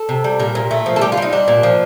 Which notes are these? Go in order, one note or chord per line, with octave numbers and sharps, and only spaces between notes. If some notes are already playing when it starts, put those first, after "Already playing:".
Already playing: A4
C3
G3
A#2 A#4
A#2
A3
F3
A4
G3 G4
F4
G3 D#4
G3 D4
A#2
F3